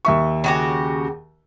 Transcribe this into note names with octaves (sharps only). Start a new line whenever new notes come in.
D#2 E5 C#6
C#3 F#4 G4